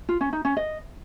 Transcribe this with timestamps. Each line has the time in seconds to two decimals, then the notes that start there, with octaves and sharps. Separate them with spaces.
0.09 F4
0.21 C#4
0.33 D#4
0.45 C#4
0.57 D#5